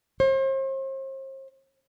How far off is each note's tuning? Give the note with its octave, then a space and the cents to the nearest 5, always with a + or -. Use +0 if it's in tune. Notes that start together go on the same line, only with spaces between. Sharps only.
C5 +40